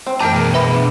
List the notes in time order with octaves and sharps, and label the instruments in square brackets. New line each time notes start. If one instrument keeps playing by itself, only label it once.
[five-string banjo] C4
[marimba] F#2 E3 A3 [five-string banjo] G4 A#4 [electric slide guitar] G5 A#5 [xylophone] A5
[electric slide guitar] B2 B3 G#4
[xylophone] B4 E5 B5
[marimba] D4